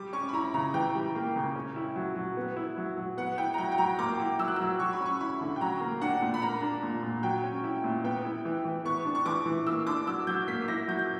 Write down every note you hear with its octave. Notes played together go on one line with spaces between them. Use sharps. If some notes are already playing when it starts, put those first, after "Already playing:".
Already playing: G3 D6
C#4 C#6
B5
E4 A#5
C#3 A#5
E3 G5
G3
A#3
C#3
C#4
E4
F#3
F#3
B3
E4
F#3
F#3
B3 F#5
E4 G5
A#5
F#3 G5
G5
F#3 A#5
A#3 D6
E4
F#3 E6
F#6
F#3 E6
F#3 C#6
B5
C#4
C#6
E4 B5
D3
G5
F#3 A#5
A#3
D4 F#5
A#2
B5
A#3 A#5
D4
A#2
A#2
F#3 G5
C#4
E4
A#2
B3 G5
E4
E3
E3
B3 C#6
D4
C#6
E3 D6
E3
A#3 E6
D4 D6
F#3 E6
F#3 G6
A#3 B6
E4 A#6
F#3 G6
G6